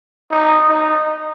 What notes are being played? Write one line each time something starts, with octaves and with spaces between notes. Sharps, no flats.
D#4
D#4